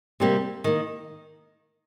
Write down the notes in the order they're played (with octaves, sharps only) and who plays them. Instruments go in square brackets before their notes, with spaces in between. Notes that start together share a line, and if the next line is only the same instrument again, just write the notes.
[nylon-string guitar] C3 G3 A#3
D#3 A#3